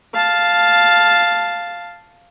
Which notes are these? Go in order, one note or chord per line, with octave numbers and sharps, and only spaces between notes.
F5 A5